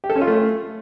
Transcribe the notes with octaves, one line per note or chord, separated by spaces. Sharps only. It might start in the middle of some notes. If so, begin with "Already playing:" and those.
G4
A4
C#4
F4
A3